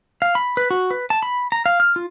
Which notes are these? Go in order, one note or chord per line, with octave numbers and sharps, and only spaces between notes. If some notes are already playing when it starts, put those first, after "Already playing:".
F5
B5
B4
F#4
B4
A5
B5
A#5
F5
F6
F4